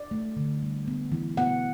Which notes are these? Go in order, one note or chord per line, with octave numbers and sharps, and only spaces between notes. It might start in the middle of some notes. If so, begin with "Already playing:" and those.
Already playing: D5
A3
D3
G3
B3
E3
B3 F#5